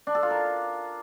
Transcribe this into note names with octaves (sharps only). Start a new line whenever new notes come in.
D4
A4
F4
A#4